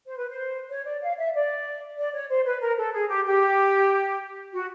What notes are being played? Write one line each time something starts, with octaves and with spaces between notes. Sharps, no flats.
C5
B4
C5
C#5
D5
F5
E5
D5
D5
C#5
C5
B4
A#4
A4
G#4
G4
G4
F#4